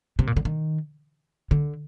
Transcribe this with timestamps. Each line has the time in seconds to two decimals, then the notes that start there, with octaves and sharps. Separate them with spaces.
0.19 C3
0.27 A#2
0.36 D3
0.45 D#3
1.51 D3